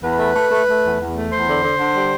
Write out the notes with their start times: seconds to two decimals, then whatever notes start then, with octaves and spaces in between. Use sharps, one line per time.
0.02 E2 B4
0.18 A3
0.35 A3
0.50 A3
0.66 A3
0.83 E2
0.99 E2
1.15 A3
1.31 E2 C5
1.48 D3
1.63 D3
1.79 D3
1.95 G3